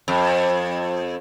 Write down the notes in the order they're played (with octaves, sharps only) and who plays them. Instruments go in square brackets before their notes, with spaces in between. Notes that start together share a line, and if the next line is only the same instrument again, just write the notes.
[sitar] F2